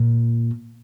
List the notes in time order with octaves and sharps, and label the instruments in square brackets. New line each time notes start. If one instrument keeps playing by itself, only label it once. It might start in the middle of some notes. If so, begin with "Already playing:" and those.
Already playing: [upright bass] A#2